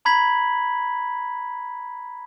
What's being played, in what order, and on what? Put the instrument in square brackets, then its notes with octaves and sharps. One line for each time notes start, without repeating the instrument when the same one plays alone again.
[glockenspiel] A#5 B5 G#6 B6 F#7